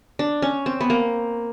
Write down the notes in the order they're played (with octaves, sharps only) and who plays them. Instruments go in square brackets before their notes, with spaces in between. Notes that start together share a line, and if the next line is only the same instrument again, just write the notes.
[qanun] D4
C#4
C4
B3
A#3